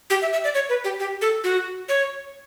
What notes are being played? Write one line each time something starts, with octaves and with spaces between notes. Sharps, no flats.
G4
E5
E5
D5
C#5
B4
G4
G4
A4
F#4
C#5